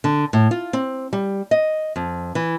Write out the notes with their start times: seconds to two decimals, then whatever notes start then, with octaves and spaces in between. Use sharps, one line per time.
0.04 D3
0.33 A2
0.51 F4
0.73 C4
1.13 G3
1.51 D#5
1.96 F2
2.35 E3